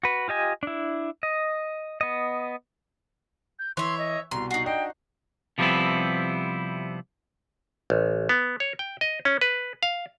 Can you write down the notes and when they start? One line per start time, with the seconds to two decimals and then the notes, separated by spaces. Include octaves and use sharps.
0.03 F#4 B4
0.28 F4 G4 D#5 G#5
0.63 D4 E4
1.23 D#5
2.01 B3 D#5
3.59 G6
3.77 E3 C#5 E5 C6
3.98 D#5
4.31 C2 B2 A#5 C6
4.51 D#4 F#4 C7
4.66 D4 D#5 G5 C7
5.58 C3 F3 G3 B3 C4 E4
7.90 A1
8.29 B3
8.60 C#5
8.79 G5
9.01 D#5
9.25 C#4
9.41 B4
9.83 F5